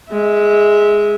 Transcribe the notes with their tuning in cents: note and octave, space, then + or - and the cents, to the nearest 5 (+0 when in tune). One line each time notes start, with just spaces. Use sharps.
G#3 +0 E5 -20